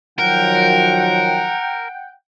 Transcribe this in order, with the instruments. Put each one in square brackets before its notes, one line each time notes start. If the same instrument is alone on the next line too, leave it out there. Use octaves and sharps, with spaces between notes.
[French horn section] D#3 F3 F#3 [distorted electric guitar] A#4 [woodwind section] F#5 G5